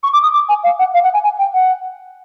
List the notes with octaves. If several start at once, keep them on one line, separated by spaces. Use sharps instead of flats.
C#6
D6
D#6
D6
G#5
F5
F#5
F5
F#5
G#5
G#5
G5
F#5